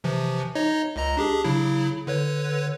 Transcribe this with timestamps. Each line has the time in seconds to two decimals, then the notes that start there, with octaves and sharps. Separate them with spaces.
0.04 C3 E3 F3
0.55 D#4 C#5 D#5
0.96 C#2 D#5 A#5
1.17 D4 G4 G#4
1.44 C#3 F#3 E4
2.07 D3 B4 C#5